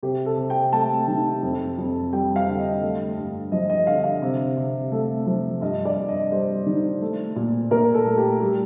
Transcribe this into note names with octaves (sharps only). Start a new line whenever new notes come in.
C3 G4
A4
C3
G5
A3 A5
D#3
F2
F2
G3 G5
F5
D3
D#5
A3
G2
F3 D#5
D#5
D3 F5
F5
C3
C3
A3
F3
G2 D#5
D5
G2
D#5
G3 C5
D#3
A3
A#2
A#2 A#4
A4
A3
G4
G3 G4